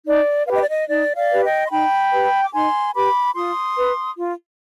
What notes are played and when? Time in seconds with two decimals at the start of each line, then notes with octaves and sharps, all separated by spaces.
0.06 D#4 D5
0.47 B4 F5
0.51 G4 D#5
0.62 D5
0.69 D#5
0.88 D#4 D5
1.16 D5 F5
1.30 G4 B4
1.44 D#5 G5
1.66 C6
1.71 D#4 G5 B5
2.12 G4 B4
2.43 D6
2.53 D#4 G#5 C6
2.94 G4 B4 B5 D6
3.36 F4 C6 D#6
3.77 B4
4.18 F4